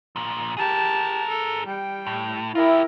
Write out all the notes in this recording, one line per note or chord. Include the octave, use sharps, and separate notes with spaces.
A#2 F3
G4 G#4 A#4 A5
A4
G3 G5
A2
E4 F4 G4 A#4